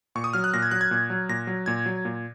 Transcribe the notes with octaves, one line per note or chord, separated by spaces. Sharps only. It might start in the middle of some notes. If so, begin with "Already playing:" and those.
A#2 C#6
D#6
F#3 F6
F#6
A#2 A#6
G#6
F#3 F#6
G#6
A#2
F#3
A#2 A#6
F#3
A#2 G#6
F#3
A#2